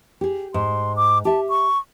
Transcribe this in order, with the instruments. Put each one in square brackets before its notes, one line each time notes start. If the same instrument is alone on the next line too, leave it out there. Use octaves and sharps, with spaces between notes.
[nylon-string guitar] G4 G#4
[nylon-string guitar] G#2 [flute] C6
[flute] D6
[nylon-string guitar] G4 E5 [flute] A5
[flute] C#6